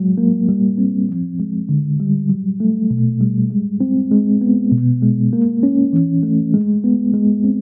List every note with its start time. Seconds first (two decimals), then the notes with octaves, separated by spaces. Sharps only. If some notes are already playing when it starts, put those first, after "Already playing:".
Already playing: F#3 G#3
0.18 A#3
0.49 G3
0.78 C4
1.09 F3
1.40 G#3
1.69 D3
2.00 G3
2.29 F#3
2.60 A3
2.90 B2
3.21 G3
3.50 G#3
3.81 C4
4.11 G#3
4.41 B3
4.72 B2
5.02 G#3
5.33 A#3
5.63 C#4
5.93 E3
6.23 A3
6.54 G#3
6.84 B3
7.13 G#3
7.44 C4